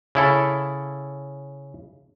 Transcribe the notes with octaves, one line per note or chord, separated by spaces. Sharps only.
C#3 E4 A4